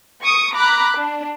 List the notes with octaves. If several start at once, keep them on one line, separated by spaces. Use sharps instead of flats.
C#6 D#6 C#7 D7
A#5 B5 D6 F#6
D4